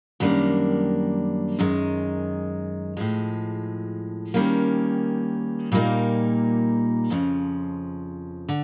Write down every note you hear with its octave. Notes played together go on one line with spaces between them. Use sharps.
F#2 D#3 G3 A#3 D4
F#2 D#3 G#3
A2 F3 G#3
D#3 G3 A#3 C#4
A#2 G3 A#3 D#4
F2 C#3 F3
D3